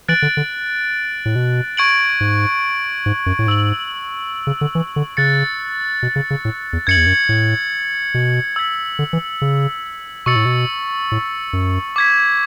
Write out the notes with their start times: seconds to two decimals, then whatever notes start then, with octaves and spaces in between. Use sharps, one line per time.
0.08 E3 F#6 A6 D7 F#7
0.22 D3
0.37 D3
1.25 A2
1.36 B2
1.77 C#6 G#6 D7 F#7
2.20 G#2
3.06 G#2
3.26 F#2
3.39 A2
3.47 G#2 E6 G#6 D7 F#7
4.47 C#3
4.61 D3
4.75 E3
4.96 D3
5.17 C#3 F#6 A6 C#7
6.03 B2
6.16 C#3
6.30 C#3
6.45 A2
6.73 E2
6.87 F#2 G#6 C#7 F#7
6.97 E2
7.06 F#2
7.29 A2
8.14 B2
8.56 E6 G#6 B6
8.99 D3
9.13 E3
9.42 C#3
10.26 B2 C#6 E6 A6 C#7
10.36 A2
10.45 B2
11.12 A2
11.53 F#2
11.96 D6 G#6 B6